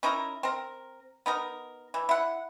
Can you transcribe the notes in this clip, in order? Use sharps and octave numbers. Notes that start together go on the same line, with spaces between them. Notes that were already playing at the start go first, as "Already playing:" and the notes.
C#4 D#4 E4 A#4
C4 A#4
B3 D#4 A#4
E3
E4 F#5